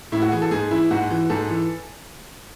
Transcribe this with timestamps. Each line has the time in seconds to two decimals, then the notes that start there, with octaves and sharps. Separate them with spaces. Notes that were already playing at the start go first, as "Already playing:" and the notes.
0.12 A2 E4
0.22 F#4
0.31 E3 G#4
0.42 A4
0.51 G#2 G#4
0.71 E3 E4
0.91 G#2 F#4
1.11 E3
1.30 G#2 A4
1.49 E3